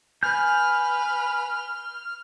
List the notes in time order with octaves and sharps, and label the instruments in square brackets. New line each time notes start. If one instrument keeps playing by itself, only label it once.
[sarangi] B4 [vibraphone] G#5 [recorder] F6 [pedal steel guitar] G6